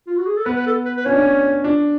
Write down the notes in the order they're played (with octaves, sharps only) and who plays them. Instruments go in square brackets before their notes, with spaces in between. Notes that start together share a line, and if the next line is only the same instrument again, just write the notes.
[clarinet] F4
F#4
G#4
A4
[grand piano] B3 [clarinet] B4
[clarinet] B4
A4
B4
B4
[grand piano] C#4 [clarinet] C#5
[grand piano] D4
C#4
D4